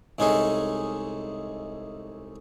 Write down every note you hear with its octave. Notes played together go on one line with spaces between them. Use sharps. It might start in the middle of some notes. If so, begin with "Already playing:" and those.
C2 G#3 C#4 D#4 G#4 A4